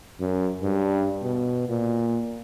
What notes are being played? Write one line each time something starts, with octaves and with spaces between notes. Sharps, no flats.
F#2
G2
B2
A#2